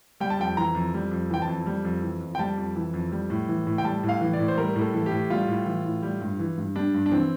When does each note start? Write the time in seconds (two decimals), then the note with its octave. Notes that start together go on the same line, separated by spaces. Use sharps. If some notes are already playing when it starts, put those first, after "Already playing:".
0.20 G3 G5
0.30 A5
0.39 F2 G5
0.57 E3 A#5
0.75 F2
0.94 G3
1.11 F2
1.30 E3 G5
1.42 A5
1.48 F2
1.66 G3
1.85 F2
2.02 E3
2.21 F2
2.35 G5
2.39 G3 A5
2.58 F2
2.76 E3
2.94 F2
3.12 G3
3.30 A2
3.49 E3
3.67 A2
3.78 G5
3.85 G3 A5
4.03 A2
4.09 F5
4.21 E3
4.33 D5
4.39 A2
4.48 C5
4.58 G3 A#4
4.76 A2
4.81 A4
4.94 E3 A4
5.06 G4
5.11 A2
5.30 G3 F4
5.48 A2
5.66 E3
5.85 A2
6.03 G3
6.21 G2
6.39 E3
6.57 G2
6.76 G3 D4
6.94 G2
7.06 D4
7.12 E3 C4